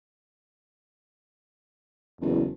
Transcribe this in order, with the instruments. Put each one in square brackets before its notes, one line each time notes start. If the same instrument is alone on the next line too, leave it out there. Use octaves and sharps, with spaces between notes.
[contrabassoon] F#1 [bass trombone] E2